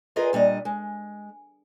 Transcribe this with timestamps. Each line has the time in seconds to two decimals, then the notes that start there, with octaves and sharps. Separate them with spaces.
0.16 F4 G#4 A#4 B4 D#5
0.33 A#2 G3 D4 D#5
0.65 G#3